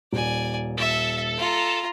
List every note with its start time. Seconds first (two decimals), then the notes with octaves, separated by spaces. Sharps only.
0.13 D#1 D5 G#5
0.78 A4 E5 A5
1.38 F4 A#5